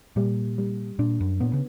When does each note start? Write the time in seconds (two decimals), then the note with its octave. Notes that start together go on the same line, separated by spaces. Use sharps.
0.16 A#2 G3
0.58 G3
0.99 A#2 D4
1.20 F#2
1.40 A#2 B3
1.53 C#3